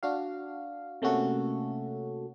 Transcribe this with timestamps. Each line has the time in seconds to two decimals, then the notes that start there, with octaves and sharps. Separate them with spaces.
0.03 D4 F#4 F5
1.02 C3 A3 A#3 C#4 F#4 A4